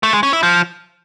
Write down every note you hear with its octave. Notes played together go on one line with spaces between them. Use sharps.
A3
G#3
C#4
E4
F3